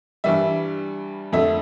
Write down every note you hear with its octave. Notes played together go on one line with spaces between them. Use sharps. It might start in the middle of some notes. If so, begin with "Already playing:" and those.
G2 E3 G3 E5
F2 D3 A3 E5